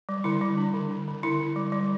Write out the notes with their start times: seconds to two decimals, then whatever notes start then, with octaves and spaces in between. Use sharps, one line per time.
0.09 G3
0.24 D3 E4
0.41 G3
0.58 D4
0.74 D3
0.91 D3
1.08 D3
1.23 D3 E4
1.40 D3
1.56 G3
1.72 G3